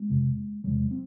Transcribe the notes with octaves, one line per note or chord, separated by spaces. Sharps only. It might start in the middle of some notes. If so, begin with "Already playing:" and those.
Already playing: G#3 A#3
F2 C3
E2 C3 F#3 G#3
C4